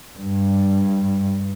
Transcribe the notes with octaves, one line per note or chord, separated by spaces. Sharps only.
G2